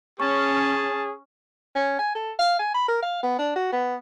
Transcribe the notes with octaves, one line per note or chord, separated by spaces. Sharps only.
C#4 G#4 A5 C#6
C#4
G#5
A4
F5
G#5
B5
A#4
F5
B3
D4
F#4
B3